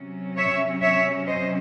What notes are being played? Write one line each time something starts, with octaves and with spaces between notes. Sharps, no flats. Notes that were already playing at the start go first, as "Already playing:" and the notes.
Already playing: C3 F#3 C#4
C#5 E5
C#5 E5
C5 D#5